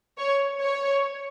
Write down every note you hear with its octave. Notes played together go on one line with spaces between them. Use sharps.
C#5
C#5